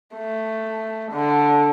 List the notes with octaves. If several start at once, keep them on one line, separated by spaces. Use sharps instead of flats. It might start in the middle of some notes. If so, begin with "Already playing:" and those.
A3
D3